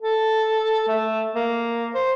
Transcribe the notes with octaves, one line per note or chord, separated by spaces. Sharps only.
A4
A3
A#3
C5